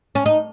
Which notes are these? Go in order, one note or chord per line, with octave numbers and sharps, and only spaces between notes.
C#4
D#4